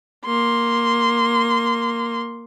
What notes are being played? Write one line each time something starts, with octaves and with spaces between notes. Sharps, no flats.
A#3 C6